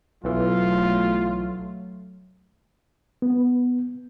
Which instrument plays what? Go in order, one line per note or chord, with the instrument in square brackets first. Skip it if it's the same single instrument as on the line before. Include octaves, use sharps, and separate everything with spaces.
[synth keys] B1 E3 [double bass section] F#3 A3 [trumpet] F4
[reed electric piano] B3